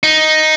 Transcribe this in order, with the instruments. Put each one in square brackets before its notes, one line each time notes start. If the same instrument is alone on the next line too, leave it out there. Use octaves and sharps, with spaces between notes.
[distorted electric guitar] D#4